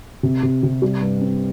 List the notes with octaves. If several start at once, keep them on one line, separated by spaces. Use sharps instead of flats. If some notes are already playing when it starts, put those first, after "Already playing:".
C3
C3
C3
G3
G2
C4